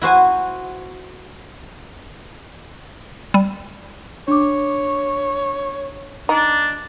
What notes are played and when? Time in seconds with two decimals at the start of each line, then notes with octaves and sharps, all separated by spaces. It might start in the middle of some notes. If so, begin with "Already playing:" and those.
0.02 E4 F#4 C5 G#5
3.34 G3
4.28 D4 C#5 D6
6.29 D4 D#4